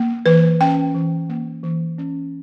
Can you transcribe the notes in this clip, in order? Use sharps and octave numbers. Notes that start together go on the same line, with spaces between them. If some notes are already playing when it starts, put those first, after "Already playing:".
Already playing: A#3
E3 B4
C#4 G5
E3
A#3
E3
C#4